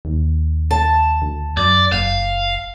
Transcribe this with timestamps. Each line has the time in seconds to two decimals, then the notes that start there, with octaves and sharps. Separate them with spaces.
0.05 D#2
0.71 A5
1.22 D2
1.57 F#2 D5
1.92 F#1 F5